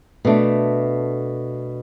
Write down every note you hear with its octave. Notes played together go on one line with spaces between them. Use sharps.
B2 A3 D4